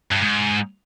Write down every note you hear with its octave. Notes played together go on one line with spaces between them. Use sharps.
G2
G#2